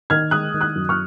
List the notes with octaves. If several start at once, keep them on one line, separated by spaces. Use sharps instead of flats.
D#3 F6 G#6
G#3 D#6 F#6
D#3
D#6 F#6
F#2
C#6 F6